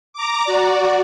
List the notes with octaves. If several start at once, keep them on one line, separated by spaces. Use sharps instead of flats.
A#5 D6
F#4 D5